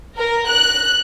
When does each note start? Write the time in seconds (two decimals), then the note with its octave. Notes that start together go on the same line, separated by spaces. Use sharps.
0.18 A#4
0.50 F#6